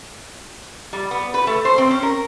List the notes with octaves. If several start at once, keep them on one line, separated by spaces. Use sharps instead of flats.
G3
B3
B4
A3
C5
C4
C#4
A#4